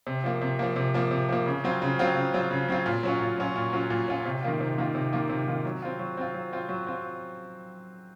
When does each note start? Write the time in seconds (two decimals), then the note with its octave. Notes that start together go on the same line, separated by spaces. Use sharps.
0.07 C3
0.24 F3 A#3
0.42 C3
0.59 F3 A#3
0.76 C3
0.94 F3 A#3
1.11 C3
1.29 F3 A#3
1.46 C#3
1.64 F#3 C4 F4
1.82 C#3
1.99 F#3 C4 F4
2.16 C#3
2.34 F#3 C4 F4
2.51 C#3
2.69 F#3 C4 F4
2.86 A#2
3.03 F#3 C#4 F4
3.20 A#2
3.38 F#3 C#4 F4
3.56 A#2
3.73 F#3 C#4 F4
3.90 A#2
4.08 F#3 C#4 F4
4.25 C3
4.42 D#3 A#3 F4
4.61 C3
4.78 D#3 A#3 F4
4.95 C3
5.13 D#3 A#3 F4
5.29 C3
5.47 D#3 A#3 F4
5.65 F#3
5.82 C4 F4
5.99 F#3
6.17 C4 F4
6.34 F#3
6.53 C4 F4
6.69 F#3
6.87 C4 F4